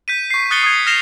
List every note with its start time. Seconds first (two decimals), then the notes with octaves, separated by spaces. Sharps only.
0.08 G6 B6 D#7
0.30 C#6 C7
0.51 D#6 F#6 A6 C#7 G7
0.63 D#6 G#6
0.86 F6 A#6 C7 E7 F7 G7